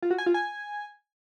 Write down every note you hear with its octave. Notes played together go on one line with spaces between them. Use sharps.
F4
F#4
G#5
F4
G#5